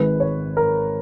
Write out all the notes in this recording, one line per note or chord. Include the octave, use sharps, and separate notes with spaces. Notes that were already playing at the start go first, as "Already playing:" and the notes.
Already playing: G#1 G#2 D#3 G#3 B4
C#5
A#4